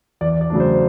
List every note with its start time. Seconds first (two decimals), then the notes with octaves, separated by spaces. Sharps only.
0.21 E2 D5
0.41 D5
0.50 C#3 F#3 A3 D4
0.60 C5